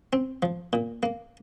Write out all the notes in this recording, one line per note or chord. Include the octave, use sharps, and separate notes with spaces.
C4
F3
A#2
A#3